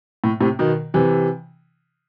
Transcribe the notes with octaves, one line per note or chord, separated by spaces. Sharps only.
A2
A2 C3
B2 D#3
C3 E3